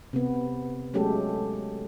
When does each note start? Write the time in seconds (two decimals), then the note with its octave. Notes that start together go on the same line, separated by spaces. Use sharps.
0.13 C3 B3
0.94 F#3 G#3 A3 C#4 G4 A4